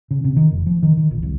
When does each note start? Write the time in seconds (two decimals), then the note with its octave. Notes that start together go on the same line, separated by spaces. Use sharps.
0.11 C#3
0.24 C3
0.36 D#3
0.51 F1
0.66 F3
0.83 D#3
0.97 D#3
1.11 A#1
1.23 C2